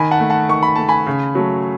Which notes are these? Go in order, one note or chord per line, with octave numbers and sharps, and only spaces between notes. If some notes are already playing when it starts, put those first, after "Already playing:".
Already playing: D#3 G#5 B5
F#5 A5
A3
F#5 A5
D#3 C#6
B5
A3 A5
G#5 B5
C#3
F#3 A3